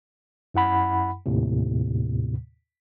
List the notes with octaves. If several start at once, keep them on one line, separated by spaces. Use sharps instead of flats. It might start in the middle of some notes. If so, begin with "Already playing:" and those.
F#2 E4 F#5 B5
D#2 A2 C3